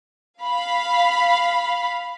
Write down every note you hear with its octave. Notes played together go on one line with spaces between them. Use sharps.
F5 B5